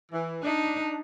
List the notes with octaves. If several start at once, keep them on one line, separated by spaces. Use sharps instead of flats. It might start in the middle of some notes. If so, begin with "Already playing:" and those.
E3
D4 D#4